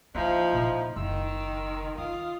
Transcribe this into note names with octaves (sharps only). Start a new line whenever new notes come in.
F3 A#3 C#4 D#4 E4 C5
A#2 C4
F#1 D#3 C6 E6
D#3 F4 D#6